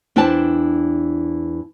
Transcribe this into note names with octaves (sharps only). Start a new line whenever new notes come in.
E2 D4 E4 C5 G5 A5